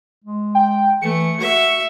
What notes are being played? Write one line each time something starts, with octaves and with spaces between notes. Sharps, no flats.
G#3
G5
E3 A3 C#7
F#4 E5